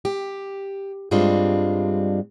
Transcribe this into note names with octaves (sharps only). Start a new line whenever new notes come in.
G4
G2 G3 G#3 C4 D4 F4